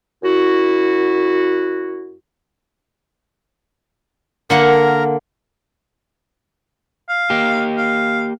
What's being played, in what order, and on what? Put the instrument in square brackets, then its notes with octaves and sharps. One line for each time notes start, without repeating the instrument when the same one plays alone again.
[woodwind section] F#2 E4 F#4
[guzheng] D3 A#3 F#5 [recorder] A#4
[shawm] F5
[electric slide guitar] A#3 G4
[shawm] F5